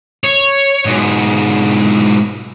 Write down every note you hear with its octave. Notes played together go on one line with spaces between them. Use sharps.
C#5
G#2 B2